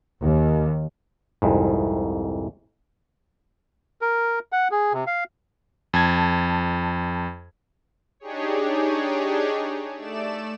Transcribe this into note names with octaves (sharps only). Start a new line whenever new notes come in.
D#2
C2 F2 G#2
A#4
F#5
G#4
C3
F5
F2 A5 G#6
D4 D#4 G4 G#4 C#5
A3 D5 E7